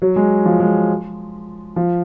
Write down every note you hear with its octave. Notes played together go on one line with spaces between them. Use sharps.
F#3
G#3
F3
G#3
F3